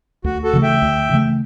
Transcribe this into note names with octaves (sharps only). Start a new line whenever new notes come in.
D2 F#4
F#4 A4
C#3 E3 A3
E5 G5
D2
C#3 E3 A3